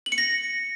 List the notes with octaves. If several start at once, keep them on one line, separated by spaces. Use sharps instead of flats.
F#7
C#7
A#6